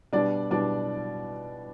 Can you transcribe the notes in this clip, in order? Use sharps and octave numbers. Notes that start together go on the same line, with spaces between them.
B2 G3 D4 D5
B2 G3 D4 D5